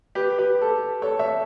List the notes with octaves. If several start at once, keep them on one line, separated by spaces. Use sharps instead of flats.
G4 B4
G4 B4
A4
A4 C#5
C#5 E5